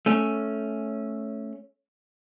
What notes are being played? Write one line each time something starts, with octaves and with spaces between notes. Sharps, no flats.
A3 C#4